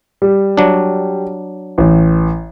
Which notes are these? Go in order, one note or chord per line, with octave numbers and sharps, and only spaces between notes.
G3
F#3 D4
A1